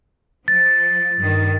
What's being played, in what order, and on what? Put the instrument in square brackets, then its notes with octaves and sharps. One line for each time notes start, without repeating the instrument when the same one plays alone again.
[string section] F3 [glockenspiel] A6
[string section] G2 D#3